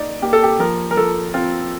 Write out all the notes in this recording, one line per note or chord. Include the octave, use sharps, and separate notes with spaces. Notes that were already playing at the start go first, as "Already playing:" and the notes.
Already playing: A#3 D#4 D5
A#3 G4
A4
G4
F3 A#4
A#4
F3 A4
C4 F4